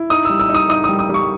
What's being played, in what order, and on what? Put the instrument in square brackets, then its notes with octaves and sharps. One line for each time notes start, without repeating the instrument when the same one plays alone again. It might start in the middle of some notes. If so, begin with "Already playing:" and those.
Already playing: [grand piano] E4
D#4 D#6
G3 E6
E6
D#4
D#6
D#4 D#6
G3 D#6
D#6
G3 C#6